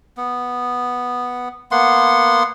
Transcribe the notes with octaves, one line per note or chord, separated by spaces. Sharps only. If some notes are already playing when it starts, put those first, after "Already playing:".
B3
A#3 B3 F#5 C6